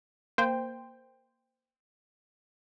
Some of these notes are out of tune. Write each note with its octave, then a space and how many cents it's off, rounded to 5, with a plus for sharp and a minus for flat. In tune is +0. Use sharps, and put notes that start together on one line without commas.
A#3 +0 C5 -15 G5 +10